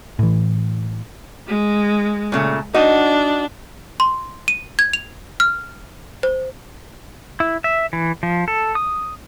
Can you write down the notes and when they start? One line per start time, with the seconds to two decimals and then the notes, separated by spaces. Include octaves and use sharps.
0.19 A2 E3
1.48 G#3
2.32 A#2 C#3 A3
2.74 D4 D#4 F#4 D#5
4.00 C6
4.48 D#7
4.79 G#6
4.93 F7
5.40 F6
6.23 C5
7.40 E4
7.64 E5
7.93 E3
8.23 F3
8.48 A4
8.75 D#6